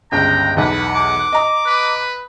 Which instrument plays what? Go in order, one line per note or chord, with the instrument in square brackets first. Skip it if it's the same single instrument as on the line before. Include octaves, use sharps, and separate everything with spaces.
[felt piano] G1 C#2 [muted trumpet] G5 [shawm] A#5
[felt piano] B1 E2 [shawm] B4 [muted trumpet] F#5
[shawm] D6
[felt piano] D#5 A#5 D#6
[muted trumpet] B4